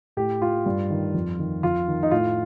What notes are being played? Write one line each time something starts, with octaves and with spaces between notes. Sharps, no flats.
A2 G4
F4
G2
D#3
F2
D#3
F2 F4
D#3
D#4
A2 F4